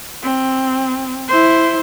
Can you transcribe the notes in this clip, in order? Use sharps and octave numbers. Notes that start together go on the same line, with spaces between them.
C4
E4 C5